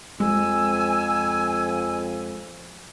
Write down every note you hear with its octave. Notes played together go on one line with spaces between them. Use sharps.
F2 G#3 G#5 E6